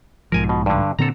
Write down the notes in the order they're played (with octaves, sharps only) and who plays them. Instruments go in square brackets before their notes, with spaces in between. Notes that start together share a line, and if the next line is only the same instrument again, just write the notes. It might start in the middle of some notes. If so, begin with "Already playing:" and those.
[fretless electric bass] B1 G#2 F3 [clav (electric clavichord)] A#4 G#5
[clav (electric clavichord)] B2
G2 D3
[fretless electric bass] A#2 D3 C4 [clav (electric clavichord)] A4 A#5